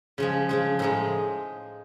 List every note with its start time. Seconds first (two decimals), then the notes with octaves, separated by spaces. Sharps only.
0.18 C#3 F3 G#3
0.49 C#3 F3 G#3
0.79 A2 F3 G#3 D#4